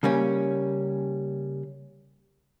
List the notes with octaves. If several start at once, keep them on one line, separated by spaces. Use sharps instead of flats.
C#3 G3 A#3 C#4